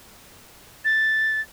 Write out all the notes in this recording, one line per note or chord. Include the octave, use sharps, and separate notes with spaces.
A6